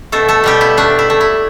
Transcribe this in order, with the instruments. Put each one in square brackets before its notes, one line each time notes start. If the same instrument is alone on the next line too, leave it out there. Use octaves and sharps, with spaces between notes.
[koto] B2 A3 A4
A3 A4
B2 G3 G4
E4
A3 D4
E4
A3
E4